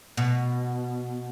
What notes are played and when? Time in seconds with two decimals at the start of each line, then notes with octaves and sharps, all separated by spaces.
0.17 B2